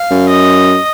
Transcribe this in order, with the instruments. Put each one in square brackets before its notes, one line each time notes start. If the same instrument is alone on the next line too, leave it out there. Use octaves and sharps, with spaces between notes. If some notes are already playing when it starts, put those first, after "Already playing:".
Already playing: [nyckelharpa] F5
[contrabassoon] F#2
[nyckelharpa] D#5